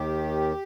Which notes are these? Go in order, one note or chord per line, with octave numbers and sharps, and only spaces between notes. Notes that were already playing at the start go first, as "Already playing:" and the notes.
Already playing: D#2 D#3 G4